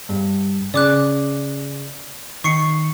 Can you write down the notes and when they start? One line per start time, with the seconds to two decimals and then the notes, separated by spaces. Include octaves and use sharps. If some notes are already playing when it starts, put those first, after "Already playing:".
0.09 G2
0.74 C#3 D5 D6 F#6
2.44 D#3 C#6 C7 C#7